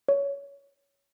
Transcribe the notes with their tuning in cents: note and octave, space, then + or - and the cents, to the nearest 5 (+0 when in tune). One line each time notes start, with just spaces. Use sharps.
C#5 +15